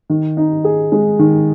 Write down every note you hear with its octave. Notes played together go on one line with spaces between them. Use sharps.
D#3
D#4
G#4
G#3
D#3